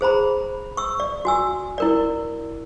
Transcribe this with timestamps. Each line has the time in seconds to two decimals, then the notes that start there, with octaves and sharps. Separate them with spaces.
0.01 G#4 C5 A#5 B5
0.77 C#6 E6
1.00 D5
1.25 F#4 G#5 E6
1.78 E4 A#4 D5